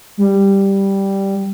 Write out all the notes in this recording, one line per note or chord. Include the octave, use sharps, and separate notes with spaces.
G3